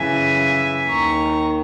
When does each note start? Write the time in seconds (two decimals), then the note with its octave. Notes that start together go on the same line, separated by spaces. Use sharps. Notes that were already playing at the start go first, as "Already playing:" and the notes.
Already playing: F#2 C#3 E3 E5 G#5
0.89 D#2 D#3 A#5 C#6